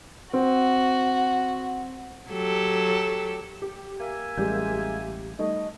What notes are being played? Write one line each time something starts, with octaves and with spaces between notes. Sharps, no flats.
C4 F#4
F#3 G4 A4
G4
A#3 E5 G#5
A1 G3 G#3 G4 G6
G3 A3 D#4 D#5